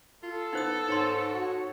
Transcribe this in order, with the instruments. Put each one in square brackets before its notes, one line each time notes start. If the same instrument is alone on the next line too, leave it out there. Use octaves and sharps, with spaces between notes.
[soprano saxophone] F4 [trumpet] A4
[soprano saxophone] B3 [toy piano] D#4 C5 D#6
[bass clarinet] G#2 [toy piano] D#4 C6 [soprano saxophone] C#5
[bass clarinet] F#4